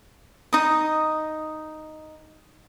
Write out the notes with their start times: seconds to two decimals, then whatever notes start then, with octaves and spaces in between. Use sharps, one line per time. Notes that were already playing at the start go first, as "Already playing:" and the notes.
0.53 D#4 D#6